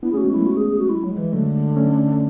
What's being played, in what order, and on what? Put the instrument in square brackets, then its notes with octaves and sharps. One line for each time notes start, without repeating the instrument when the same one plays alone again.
[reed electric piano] B3 D4 [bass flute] E4
[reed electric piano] A3 C#4 [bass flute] G#4
[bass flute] F#4
[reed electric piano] G#3 B3
[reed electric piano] F#3 A3 [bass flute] E4
[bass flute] F#4
G#4
G#4
F#4
[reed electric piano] G#3 [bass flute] E4
[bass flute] F#3
[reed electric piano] G#3
[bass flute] F#3
E3
[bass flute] D3 [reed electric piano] F#3 A3
[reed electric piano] A3 C#4